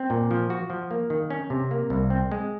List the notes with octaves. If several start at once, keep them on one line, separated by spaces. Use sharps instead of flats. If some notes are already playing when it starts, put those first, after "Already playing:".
Already playing: C4
A#2
F3
F#4
F3
A#3
D#3
C#4
C3
A#3
C2
C4
G#3